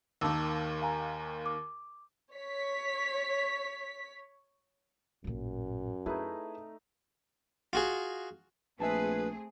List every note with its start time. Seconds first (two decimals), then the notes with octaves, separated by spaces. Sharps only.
0.21 D#2 D#3 A5 D6 E6
0.82 F5 G#5 A#5
1.46 D6
2.34 C#5 B6
5.24 A1 F#2 A#2
6.06 A3 C4 D#4 E4 G#4 B4
7.73 F4 F#4 G#4
8.80 A#1 A3 C4 G#4 B4 E5 G#5 A5